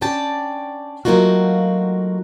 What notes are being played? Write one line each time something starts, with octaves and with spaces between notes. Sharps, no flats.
C#4 D4 D5 G5 A5
F#3 A3 A#3 D#4 F4 F#4